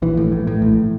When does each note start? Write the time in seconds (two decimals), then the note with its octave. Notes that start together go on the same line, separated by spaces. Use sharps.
0.02 A#1 E3
0.17 A2
0.32 A2
0.47 A2
0.62 A#1